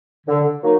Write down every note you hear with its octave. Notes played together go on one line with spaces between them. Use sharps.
D3
F#3 A#3 D#4